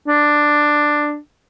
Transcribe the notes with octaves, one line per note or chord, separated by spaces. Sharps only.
D4